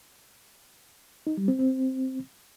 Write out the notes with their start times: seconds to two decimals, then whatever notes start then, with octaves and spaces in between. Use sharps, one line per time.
1.27 D#4
1.37 G3
1.48 C4
1.59 C4